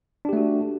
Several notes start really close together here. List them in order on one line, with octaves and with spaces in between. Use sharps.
D4 G4 A3 F#4